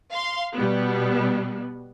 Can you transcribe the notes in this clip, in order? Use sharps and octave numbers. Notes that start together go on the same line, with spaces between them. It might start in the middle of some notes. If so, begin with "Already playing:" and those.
F5 C6
B2 G3 B3